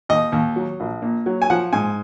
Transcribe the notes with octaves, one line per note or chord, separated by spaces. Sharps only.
D#2 D#5
D#2
F#3
A#1
A#2
F#3
G#5
F3 F#5
G#2 G#5